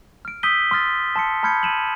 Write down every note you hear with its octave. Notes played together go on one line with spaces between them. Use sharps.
F6 D7
D#6 E6 G6 B6 D#7 G7
C6 D#6 F6 A6
A5 C6 C#7
A5 B5 F6 G6 G#6 C#7
D#7 E7 F#7